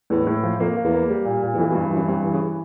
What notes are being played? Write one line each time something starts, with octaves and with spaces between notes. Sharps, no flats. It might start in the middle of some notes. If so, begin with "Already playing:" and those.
E2 A2
A2
F3
F2 A#3
A#3
E2
A#3
G3
A#2
A#2
E2
F2 E3
B2
G2
C3
F#2 E3
G2 C3
E3
C#3